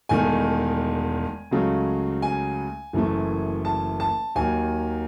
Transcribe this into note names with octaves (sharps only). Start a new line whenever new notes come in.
E1 E2 D#3 A3 G#5
C#2 C#3 F#3 A3
G#5
F#1 F#2 E3 A3
A5
A5
D#2 D#3 F#3 G#5